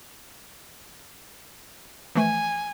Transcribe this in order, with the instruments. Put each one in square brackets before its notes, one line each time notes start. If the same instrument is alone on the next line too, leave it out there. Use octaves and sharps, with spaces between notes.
[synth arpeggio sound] E3 F3 A3 [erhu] G#5